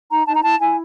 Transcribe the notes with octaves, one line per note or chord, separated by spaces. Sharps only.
D#4 A#5
D#4 A5
A#5
E4 A5
E4 G#5